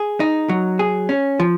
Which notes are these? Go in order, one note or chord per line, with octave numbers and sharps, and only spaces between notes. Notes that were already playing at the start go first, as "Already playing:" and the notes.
Already playing: G#4
D#4
F#3
G#4
C#4
F3